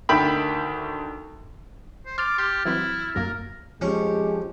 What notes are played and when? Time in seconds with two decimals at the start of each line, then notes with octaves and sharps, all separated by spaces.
0.09 D2 D#3 E5 G5 B5
2.06 C5
2.18 C6 D6 F6 A6 F7
2.38 G4 C6
2.65 E3 F#3 C4 E4
3.15 B1 F#2 A#3 A#4
3.81 F2 F3 G#3 C#4 G4 C#6